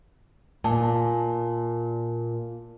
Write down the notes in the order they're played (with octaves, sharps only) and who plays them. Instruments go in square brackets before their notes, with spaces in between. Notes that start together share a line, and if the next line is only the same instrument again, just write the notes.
[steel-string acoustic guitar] A#2 [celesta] G#5 A5